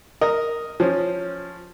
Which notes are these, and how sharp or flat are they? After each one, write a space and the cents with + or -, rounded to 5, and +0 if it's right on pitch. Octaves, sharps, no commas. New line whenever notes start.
A#4 -5 D#5 +0
F3 +10 C#4 +0 C5 +0